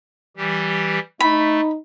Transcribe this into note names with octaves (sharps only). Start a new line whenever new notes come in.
E3 G3 G4
A3 D#4 B5